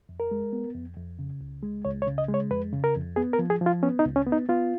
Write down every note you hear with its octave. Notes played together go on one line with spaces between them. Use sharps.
F2
A#4
G#3
B3
F2
F2
C#3
C#2
G#3
C#2 C#5
C#5
C#3
D#5
G#3
C#5
F2 B4
C#3
A#4
F2
B3 G#4
A#4
F3
G#4
F3 F4
B3 C#4
D#4
C#2
C#4
B3
D#4
B3 F4